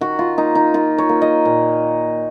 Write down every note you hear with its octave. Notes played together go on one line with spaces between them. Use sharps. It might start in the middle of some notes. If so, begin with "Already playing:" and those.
D#3 F#4
F4
A#3 D#4
D#4
D#3 F4
C#5
A#3
D#5
A#2